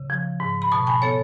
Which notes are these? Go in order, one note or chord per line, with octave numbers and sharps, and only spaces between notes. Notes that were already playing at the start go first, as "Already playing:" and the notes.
Already playing: C#3
F3
G#2
B5
B2 A5 C#6
G#5 B5
B3 A4 C#5